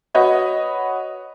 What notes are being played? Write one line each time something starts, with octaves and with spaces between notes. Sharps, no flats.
F#4 B4 C#5 D#5